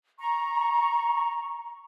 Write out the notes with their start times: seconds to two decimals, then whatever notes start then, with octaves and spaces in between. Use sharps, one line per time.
0.19 A#5 C#6